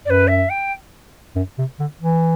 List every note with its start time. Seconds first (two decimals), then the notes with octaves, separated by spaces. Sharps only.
0.05 F#2 B4 D5
0.27 E5
0.49 G5
1.36 F#2
1.58 C3
1.80 D3
2.01 E3